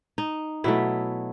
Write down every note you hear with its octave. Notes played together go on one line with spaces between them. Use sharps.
D#4
B2 F#3 A3 E4